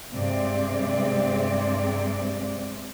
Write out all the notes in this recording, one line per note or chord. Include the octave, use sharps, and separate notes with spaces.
G2 C3 G#3 C4 D5